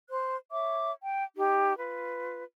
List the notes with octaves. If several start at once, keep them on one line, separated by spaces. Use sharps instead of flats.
C5 F#6
C#5 E5 D6
G5
D#4 G4
F4 B4